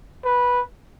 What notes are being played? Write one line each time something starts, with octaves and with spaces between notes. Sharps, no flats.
B4